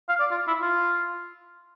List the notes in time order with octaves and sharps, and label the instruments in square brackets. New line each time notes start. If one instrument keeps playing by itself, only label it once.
[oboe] F5
D5
F4
E4
F4